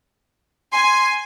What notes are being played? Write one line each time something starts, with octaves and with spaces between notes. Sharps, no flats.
G#5 C6